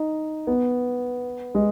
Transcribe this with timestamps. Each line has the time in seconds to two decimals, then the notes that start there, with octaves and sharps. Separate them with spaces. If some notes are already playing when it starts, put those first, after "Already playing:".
Already playing: D#4
0.47 B3
1.55 G#3